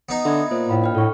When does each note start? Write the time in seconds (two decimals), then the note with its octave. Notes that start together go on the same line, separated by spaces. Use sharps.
0.09 B3 D#4
0.25 D3 E5 B5 G#6
0.51 A#2 C5
0.69 A2 D#5 F5 B5
0.82 D4 G5 F6
0.95 A2 A4 C#6